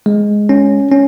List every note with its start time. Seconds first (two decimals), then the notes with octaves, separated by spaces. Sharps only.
0.06 G#3
0.49 C#4
0.91 C#4